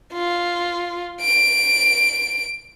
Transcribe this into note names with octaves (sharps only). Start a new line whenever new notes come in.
F4
D7